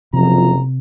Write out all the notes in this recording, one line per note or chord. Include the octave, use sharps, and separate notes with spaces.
F#1 F2 C3 F3 A#5